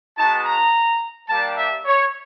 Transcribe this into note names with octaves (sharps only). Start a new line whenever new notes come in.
G#3 B3 D#4 F#4 A5
A#5
G3 A#3 D4 G4 A5
E5
C#5